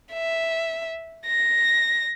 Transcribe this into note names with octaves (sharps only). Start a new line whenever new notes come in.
E5
A#6